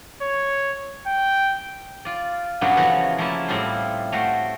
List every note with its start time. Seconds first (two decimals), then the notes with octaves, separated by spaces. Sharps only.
0.22 C#5
1.07 G5
2.05 F4 D5
2.61 G2 A#2 C#3 F#3 B3 C#4
2.77 C#3 E3 F3 A3 F#4 F#5
3.18 F3 A3 A#3 E4 A5
3.48 A2 G3 C4 E4 F4 C5
4.12 A3 F#4 C5 G5